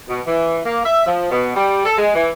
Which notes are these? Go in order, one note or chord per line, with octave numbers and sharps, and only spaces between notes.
B2
E3
A#3
E5
F3
B2
G3
A4
G#3
E3